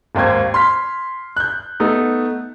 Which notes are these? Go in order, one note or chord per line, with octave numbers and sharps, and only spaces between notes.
G#1 D#2 A#3 C5 G#6
C6 F6 B6
F#6 G6
A3 B3 D#4